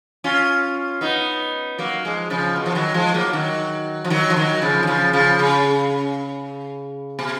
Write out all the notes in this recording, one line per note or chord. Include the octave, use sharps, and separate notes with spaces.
C#4 F4
B3 D#4
F#3 A#3
F3 G#3
C#3 F3
B2
F3
D#3 F#3
F3 G#3
F#3 A#3
D#3 F#3
F3
D#3 F#3
F3
D#3 F#3
C#3 F3
D#3
C#3 F3
C#3 F3
C#3
B2